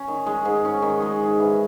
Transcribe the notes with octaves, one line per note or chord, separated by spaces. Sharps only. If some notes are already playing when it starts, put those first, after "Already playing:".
Already playing: C#4
D#3
G#3
G#2
C#4
D#3
G#3
G#2
E3